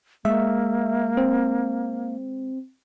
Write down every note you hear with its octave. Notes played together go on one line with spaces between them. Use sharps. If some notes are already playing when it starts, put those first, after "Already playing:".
G#3 A#3 E5
C4